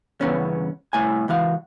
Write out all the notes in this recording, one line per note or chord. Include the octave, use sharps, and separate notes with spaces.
E2 G2 C#3 B3 C#4
C2 A2 G#5
C#2 E3 F#4 F5